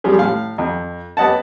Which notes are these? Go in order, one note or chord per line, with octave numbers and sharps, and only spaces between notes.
F3 G3 G4 G#4
A2 F5
F2
B3 G4 D#5 F#5 A5